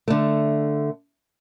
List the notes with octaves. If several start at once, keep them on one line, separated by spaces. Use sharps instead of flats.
D3 A3